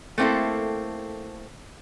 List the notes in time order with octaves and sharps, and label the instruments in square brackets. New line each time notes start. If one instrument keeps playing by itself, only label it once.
[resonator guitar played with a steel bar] A3 A#3 C4 D#4 E4 A4